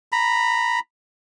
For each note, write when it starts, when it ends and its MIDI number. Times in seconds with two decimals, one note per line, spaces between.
0.12 0.79 82
0.12 0.79 83